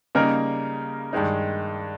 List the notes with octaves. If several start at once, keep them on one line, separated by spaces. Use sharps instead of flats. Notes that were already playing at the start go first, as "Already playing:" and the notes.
C#3 G3 A#3 D#4 A#4
G2 D#3 G#3 D#4